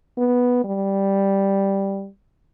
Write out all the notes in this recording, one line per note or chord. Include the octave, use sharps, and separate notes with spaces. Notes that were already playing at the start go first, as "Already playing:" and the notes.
B3
G3